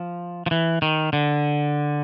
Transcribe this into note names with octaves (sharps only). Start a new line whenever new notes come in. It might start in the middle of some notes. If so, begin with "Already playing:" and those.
Already playing: F3
F3
E3
D#3
D3